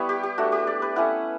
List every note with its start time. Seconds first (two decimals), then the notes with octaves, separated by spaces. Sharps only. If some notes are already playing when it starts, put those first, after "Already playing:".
Already playing: G3 B3 E4 B4 C#5
0.09 G4
0.23 G4
0.38 A3 D4 F#4
0.52 G4
0.67 D5
0.82 B4
0.96 A3 C#4 E4 F#5